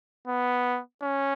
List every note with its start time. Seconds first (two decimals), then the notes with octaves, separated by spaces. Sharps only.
0.27 B3
1.02 C#4